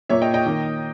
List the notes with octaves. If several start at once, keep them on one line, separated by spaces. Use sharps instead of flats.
A#2 A#3 C#5 E5
D#5 G5
D#5 G5
D#3 A#3